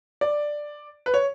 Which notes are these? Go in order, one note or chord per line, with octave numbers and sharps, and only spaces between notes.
D5
B4
C#5